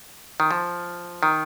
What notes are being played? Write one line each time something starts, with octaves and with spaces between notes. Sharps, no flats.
D#3
F3
D#3